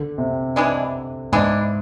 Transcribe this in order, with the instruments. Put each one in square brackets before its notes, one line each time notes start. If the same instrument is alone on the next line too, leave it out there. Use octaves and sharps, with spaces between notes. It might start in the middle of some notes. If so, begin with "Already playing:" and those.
Already playing: [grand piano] D3
C3
[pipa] E3 G#3 D4
[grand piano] G#2 [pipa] E3 G#3 D4